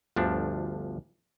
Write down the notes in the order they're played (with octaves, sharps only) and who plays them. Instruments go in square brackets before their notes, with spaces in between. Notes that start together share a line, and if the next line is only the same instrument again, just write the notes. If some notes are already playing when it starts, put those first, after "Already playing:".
[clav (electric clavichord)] G1 D2 F3 D4